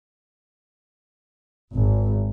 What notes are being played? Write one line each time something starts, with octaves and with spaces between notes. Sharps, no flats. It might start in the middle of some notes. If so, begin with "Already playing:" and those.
G#1